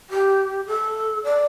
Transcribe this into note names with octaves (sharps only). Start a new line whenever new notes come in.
G4
A4
D5